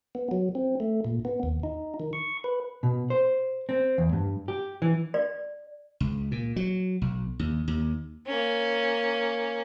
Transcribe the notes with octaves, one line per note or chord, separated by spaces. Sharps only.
B3
F#3
C4
A3
A#2
B3
D#2
D#4
D#3
C#6
B4
B2
C5
C4
E2
G2
G4
E3
D5
C#2
A#2
F#3
B1
D#2
D#2
A#3 C#4